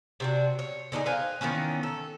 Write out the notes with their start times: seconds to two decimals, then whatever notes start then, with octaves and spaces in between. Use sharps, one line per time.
0.20 C3 D4 F#4
0.59 C#5
0.92 D3 D4 D#4 G#4
1.06 B4 C5 F5 G#5
1.41 D#3 E3 B3 C#4
1.83 A4